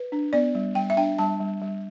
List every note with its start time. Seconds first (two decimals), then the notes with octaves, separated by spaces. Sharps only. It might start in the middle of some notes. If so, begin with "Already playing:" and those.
Already playing: B4
0.12 D4
0.33 B3 D5
0.55 G3
0.75 G3 G5
0.90 E5
0.97 D4 G5
1.18 G3 A5
1.40 G3
1.62 G3